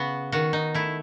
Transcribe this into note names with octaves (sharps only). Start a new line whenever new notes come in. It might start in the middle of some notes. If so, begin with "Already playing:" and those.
Already playing: C#3 B3 F#4
D#3 F#4
D#4
A3 E4